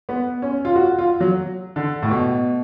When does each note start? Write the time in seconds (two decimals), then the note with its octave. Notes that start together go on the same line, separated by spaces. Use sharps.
0.09 B3
0.42 C#4
0.65 F4
0.76 F#4
0.99 F4
1.20 F#3
1.76 D3
2.02 A2
2.10 B2